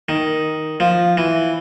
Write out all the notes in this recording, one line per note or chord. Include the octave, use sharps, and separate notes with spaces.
D#3
F3
E3